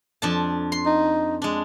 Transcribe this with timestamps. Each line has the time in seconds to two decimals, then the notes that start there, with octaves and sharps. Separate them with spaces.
0.22 F2 D4 A5
0.72 C6
0.86 D#4
1.42 G#3 D4